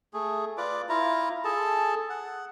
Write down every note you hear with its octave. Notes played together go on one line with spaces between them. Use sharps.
A3 G#4
F4 B4 D5 D6
E4 F4 A#5
G#4 A4 A5
F#5